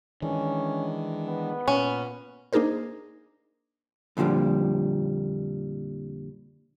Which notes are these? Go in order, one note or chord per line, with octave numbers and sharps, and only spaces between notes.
D#3 E3 G#3 C#4 D4
B3
A#2 C#4
A#3 D4 D#4 G#4 A#4 C5
F2 A#2 D3 F3 G3